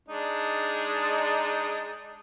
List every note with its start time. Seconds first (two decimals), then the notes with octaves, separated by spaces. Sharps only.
0.09 G#3 D4 D#4